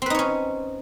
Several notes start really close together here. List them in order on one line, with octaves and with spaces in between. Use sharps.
C4 B4 D#4 C#5 C#4